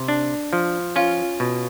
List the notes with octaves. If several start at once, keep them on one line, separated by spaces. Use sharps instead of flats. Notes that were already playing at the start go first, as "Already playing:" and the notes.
Already playing: C3
D4
F3
C#4 F4
B2